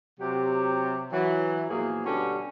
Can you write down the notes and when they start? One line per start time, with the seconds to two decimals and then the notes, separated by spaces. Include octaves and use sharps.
0.20 C3 F#3 G4
1.12 E3 F#3
1.69 E2 A#2 F3 F#3 A#3 G#4
2.05 B2 D3 G3 C#4 F#4 G4